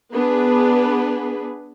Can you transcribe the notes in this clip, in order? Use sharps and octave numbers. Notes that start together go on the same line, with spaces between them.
B3 D4 G#4 B4